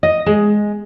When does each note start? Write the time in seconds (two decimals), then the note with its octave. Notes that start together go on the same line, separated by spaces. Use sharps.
0.03 D#5
0.26 G#3